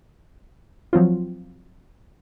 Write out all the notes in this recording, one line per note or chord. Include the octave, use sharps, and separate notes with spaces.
F3 F#3 C4 F4